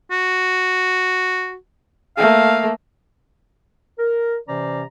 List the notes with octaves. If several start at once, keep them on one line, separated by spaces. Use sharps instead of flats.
F#4
A3 A#3 F5
A#4
C3 E3 C#4 C5 D5 A#5